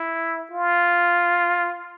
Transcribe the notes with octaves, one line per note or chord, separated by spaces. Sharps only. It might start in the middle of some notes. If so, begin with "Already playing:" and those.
Already playing: E4
F4